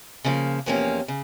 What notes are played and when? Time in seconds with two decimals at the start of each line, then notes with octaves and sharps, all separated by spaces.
0.24 C#3 F3 A#3
0.66 E2 C3 F3 A#3 C#4
1.08 C#3